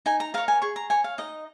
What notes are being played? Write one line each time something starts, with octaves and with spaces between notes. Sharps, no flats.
D#4 G#5
A#5
A#4 C#5 F5
G#5
G#4 C#6
A#5
C#5 G#5
F5
D#4 D#5